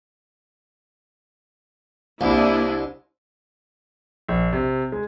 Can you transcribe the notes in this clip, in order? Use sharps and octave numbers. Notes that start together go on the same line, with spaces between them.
C2 A#3 D4 E4 D#5
A#1
C3
G#3